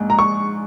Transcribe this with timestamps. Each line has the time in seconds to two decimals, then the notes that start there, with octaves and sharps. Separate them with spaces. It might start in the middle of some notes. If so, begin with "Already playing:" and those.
Already playing: A#1 G#2
0.10 A#5
0.19 C#6